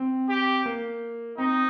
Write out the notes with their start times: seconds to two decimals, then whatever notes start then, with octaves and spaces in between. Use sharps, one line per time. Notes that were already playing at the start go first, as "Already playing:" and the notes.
Already playing: C4
0.29 G4
0.66 A#3
1.38 C4 D#4